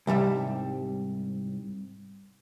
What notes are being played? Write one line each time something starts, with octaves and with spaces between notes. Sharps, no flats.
C2 G#2 G3 E5